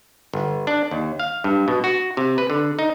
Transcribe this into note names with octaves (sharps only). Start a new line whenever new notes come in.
G1
D4
D#2
F5
G2
B2
F#4
C3
B4
D3
D#4